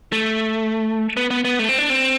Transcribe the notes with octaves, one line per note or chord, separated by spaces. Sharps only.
A3
B3
B3
B3
A3
C4
D4
C4